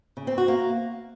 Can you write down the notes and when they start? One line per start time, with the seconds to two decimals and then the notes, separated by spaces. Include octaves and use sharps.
0.17 C#3
0.27 C4
0.38 F#4
0.48 A#3